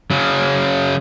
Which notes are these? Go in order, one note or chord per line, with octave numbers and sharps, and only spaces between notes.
C#3 F#3